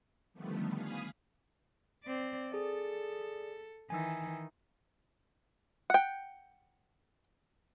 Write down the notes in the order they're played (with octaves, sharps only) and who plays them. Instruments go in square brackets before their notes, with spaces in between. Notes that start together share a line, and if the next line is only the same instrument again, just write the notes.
[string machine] D3 D#3 F3 G3 A3 B3
F5 G#5 B5 D#6
[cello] C4 D5
[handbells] G#4 D5 [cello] A4
[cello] D#3 E3 [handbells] G#5 E6
[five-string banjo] F#5 G5